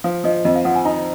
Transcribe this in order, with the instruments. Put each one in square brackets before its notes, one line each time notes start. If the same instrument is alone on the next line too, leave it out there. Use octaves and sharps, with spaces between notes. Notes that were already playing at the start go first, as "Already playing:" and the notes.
[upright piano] F3 [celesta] F5
[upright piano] F3 [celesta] D#5
[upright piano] F2 [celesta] D#5
[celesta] F5
[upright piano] F3 [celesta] F#5
[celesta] G#5
[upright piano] D#4 [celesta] A#5